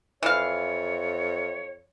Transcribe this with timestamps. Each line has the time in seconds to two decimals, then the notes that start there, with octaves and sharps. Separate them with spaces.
0.23 F2 E3 C#5 F5